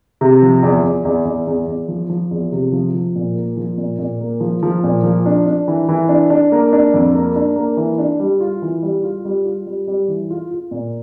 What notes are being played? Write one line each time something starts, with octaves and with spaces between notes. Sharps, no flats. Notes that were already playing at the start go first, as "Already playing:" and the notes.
C3
F3
E2
E2
E2
E2
E2
E2
F3
F3
E2
C3
F3
F3
A#2
A#3
F3
A#2
A#2
A#3
F3
F3
A#2
F3
D4
D4
E3
E3
D4
D4
A#3
D4
F2
A#3
D4
A#3
E3
D4
G3
F4
E3
G3
F4
G3
F4
G3
G3
E3
F4
F4
A#2